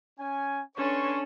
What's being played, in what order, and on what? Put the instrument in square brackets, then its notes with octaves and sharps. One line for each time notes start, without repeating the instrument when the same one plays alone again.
[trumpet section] C#4 G#5
[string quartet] C#4 D4 A4 [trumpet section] B4 C6 C#6